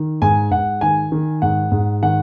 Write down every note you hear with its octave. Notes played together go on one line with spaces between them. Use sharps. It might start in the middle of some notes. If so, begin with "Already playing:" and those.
Already playing: D#3
G#2 G#5
G#2 F#5
D#3 G#5
D#3
G#2 F#5
G#2
D#3 F#5